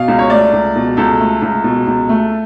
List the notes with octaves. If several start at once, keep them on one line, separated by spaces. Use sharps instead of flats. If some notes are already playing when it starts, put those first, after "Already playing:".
Already playing: B2 F5
C#2
C#5
A3 D5
C#2
B2
C#2 A4
A3
C#2
B2
C#2
A3